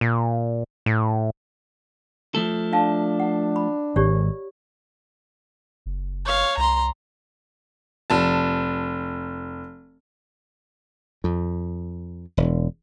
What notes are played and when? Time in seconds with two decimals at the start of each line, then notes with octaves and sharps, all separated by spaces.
0.01 A#2
0.86 A2
2.35 F3 A3 A4
2.72 D4 E5 F5 A5
3.20 F#5
3.56 B5
3.96 G#1 G4 C#5 D5
5.86 F#1
6.25 C#5 F5
6.57 C2 A#5 C6
8.10 F1 A5
11.24 F2
12.37 E1